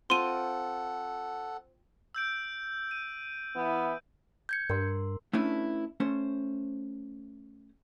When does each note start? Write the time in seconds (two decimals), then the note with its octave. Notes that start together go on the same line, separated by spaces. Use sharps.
0.10 C4 F4 A4 F#5 G5 C6 D#7
2.15 E6 G6 D7
2.91 D#7
3.55 E3 B3 E4
4.49 G6 G#6 C#7
4.70 G2 A#4 C6
5.33 A3 C#4 D4 E4 B4
6.00 A3 C#4 C5